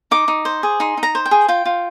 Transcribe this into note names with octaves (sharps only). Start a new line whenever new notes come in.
D#4 D6
D#4
C5
G#4
D#4 C6
D#4
A#5
C5
G5
G#4
F4 G5
F4